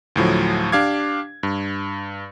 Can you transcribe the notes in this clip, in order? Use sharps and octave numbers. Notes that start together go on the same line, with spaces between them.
D2 A2 F3 F#3
D4 G4 F5 D6 G#6
G2